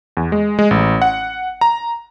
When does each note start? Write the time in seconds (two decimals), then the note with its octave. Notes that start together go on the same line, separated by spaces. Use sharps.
0.17 E2
0.32 G#3
0.59 G#3
0.71 A1
1.02 F#5
1.61 A#5